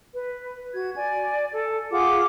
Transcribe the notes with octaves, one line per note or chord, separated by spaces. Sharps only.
B4
F#4 G#6
D5 G#5
A4
F4 G#4 F#5 D6